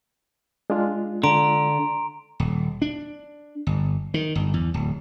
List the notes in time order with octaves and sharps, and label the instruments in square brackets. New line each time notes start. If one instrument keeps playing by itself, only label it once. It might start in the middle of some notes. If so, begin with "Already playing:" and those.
[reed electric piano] G#3 D4 F4
[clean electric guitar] D3 [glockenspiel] A#5 C6 D7
[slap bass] D#1
D4
G1
D#3
G1
E2
D1